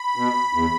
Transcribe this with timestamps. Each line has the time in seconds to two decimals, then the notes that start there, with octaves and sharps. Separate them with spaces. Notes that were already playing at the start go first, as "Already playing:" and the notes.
Already playing: B5
0.16 B2
0.53 E2